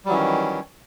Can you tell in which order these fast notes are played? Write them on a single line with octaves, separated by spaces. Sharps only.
G3 F#3 E3 C#4 D#3